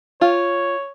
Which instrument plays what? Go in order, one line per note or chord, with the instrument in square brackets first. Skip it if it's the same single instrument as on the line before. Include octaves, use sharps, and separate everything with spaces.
[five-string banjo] F4 [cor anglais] C#5